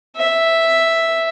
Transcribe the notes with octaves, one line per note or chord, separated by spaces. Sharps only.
E5